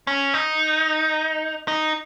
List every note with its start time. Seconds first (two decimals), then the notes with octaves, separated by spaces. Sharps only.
0.07 C#4
0.34 D#4
1.68 D#4